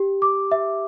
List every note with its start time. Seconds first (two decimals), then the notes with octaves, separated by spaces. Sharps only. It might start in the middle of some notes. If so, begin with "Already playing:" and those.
Already playing: G4
0.22 D6
0.51 E5